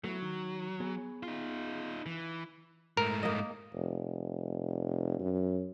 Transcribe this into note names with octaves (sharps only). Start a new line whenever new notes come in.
F#3 A3 B3 E4
D#3
B3 G#4 C#5
D#4 F4
E3
G#2 A3 A#4
A#3 D#5
F1
F#2